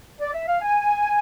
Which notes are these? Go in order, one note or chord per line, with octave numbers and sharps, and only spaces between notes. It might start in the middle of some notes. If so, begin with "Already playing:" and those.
D5
E5
F5
G#5